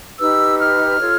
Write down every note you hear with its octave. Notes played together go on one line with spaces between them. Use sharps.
D#4 G4 B4 E6
F6
F4 A4 C#5